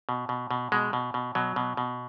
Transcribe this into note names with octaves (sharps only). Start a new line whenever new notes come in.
B2
B2
B2
B2 G#3
B2
B2
B2 F#3
B2
B2